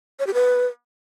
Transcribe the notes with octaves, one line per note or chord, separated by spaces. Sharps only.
C#5
G4
B4